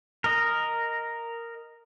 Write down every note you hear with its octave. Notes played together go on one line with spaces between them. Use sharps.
A#4 D#5